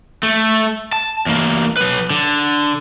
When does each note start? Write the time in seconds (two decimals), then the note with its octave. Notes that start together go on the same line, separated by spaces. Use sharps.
0.23 A3
0.93 A5
1.26 E2 A#3
1.77 F#3 B4
2.10 D3